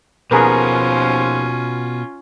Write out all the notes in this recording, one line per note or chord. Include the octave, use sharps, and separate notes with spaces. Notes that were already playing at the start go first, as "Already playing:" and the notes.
D#2 B2 F3 C#4 F4 G#4 A#4 B4